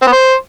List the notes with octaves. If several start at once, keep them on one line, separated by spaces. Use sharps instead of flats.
C4
B3
C5